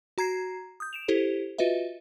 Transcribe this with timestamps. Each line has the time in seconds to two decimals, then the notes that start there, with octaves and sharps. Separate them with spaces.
0.18 F#4 A#5 G#6 C7
0.80 D#6 G6
0.93 D7 E7 F7
1.08 E4 G4 A4 C5
1.58 F4 F#4 B4 D#5 E5